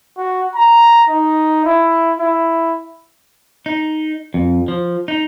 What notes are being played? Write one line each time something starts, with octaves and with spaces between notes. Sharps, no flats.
F#4
A#5
D#4
E4
E4
D#4
F2
F3
D#4